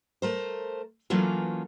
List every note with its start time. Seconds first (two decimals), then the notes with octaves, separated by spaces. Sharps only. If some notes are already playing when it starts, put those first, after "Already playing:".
0.22 A3 A#4 C5
1.10 E3 F#3 A3 A#3 C#4 F4